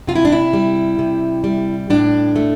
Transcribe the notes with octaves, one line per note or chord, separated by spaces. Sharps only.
C3 F4
E4
D4
E4
G3
C3
G3
A2 D4
A3